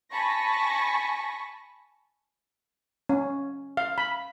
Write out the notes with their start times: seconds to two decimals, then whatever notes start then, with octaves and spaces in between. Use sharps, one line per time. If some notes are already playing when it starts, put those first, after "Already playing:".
0.12 G#5 A5 B5 C#6 A#6
3.09 C#4
3.77 F5
3.98 B5